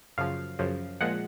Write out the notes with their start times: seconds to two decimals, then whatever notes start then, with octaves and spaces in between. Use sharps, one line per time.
0.18 F#2 C#3 F3 F5
0.59 F#2 C#3 F3
1.00 A#2 F3 G#3 F#5